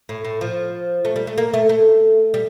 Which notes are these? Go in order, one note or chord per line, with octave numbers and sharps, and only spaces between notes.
A2
A2
F3
A3
G3
A3
A#3
A3
A3
G3